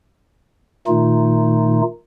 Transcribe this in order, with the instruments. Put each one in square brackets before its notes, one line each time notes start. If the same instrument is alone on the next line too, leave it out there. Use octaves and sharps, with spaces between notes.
[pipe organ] A#2 D#3 A3 D#4 F4